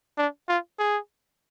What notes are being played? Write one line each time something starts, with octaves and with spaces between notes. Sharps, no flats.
D4
F4
G#4